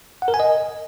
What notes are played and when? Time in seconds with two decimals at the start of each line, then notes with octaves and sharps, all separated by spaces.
0.22 F#5
0.28 A#4
0.34 G#5
0.40 D#5